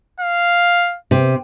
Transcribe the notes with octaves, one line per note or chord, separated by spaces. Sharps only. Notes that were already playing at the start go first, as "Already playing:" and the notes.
F5
C3